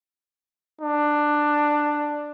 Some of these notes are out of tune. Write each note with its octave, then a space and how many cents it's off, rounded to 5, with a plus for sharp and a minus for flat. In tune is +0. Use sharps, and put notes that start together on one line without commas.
D4 +10